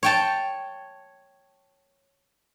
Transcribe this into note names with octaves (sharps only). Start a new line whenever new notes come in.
C#5 G5 A5